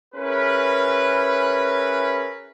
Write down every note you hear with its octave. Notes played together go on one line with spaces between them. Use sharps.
C#4 E4 G#4 A#4 B4